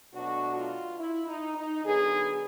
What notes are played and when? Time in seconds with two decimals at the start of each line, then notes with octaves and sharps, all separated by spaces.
0.12 B2 F#3 A3 D4 F#4
0.55 F4
0.98 E4
1.27 D#4
1.56 D#4
1.84 D3 F#3 B3 G#4